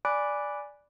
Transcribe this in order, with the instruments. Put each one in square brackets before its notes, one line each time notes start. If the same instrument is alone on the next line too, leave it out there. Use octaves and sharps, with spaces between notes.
[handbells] D5 G#5 B5 D6 F#6 D7